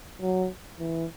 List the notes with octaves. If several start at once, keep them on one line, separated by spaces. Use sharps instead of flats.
F#3
E3